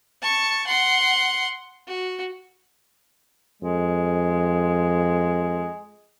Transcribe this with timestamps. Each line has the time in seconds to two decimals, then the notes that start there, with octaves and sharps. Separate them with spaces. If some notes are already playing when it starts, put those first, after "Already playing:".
0.22 A5 C#6
0.67 F#5 C6
1.88 F#4
3.62 F2 G#3